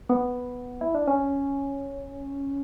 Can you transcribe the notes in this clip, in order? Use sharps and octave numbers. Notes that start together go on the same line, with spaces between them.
B3
E4
D4
C#4